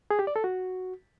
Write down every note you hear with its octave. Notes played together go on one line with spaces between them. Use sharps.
G#4
G4
D5
A4
F#4